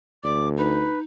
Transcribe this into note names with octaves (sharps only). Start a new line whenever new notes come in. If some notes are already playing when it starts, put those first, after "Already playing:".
D2 D5 D6
D#4 B4